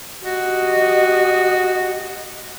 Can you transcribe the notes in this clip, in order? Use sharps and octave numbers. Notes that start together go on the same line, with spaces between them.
F#4 G4 D#5